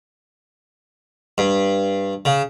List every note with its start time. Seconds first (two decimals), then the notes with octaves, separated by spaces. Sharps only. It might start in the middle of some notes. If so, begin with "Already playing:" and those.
1.38 G2
2.25 C#3